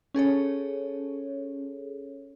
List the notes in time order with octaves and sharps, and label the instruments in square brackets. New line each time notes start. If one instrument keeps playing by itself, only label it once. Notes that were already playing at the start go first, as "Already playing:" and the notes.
[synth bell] C#4 G#4 A4 C#5